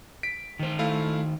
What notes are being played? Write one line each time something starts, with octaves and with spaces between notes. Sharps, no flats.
B6 D7
D#3 C5
A3 E4 F5